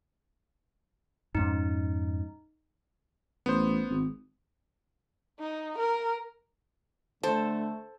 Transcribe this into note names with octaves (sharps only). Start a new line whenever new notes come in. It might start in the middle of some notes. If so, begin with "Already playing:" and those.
F2 G#2 C#4 D#4
A1 B3 C5
G#1
D#4
A#4
D3 A3 A4 C5